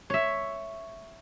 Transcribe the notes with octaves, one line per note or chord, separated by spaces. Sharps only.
C#5 E5